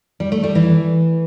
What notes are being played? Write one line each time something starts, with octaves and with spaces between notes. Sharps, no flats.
G3
A3
G3
E3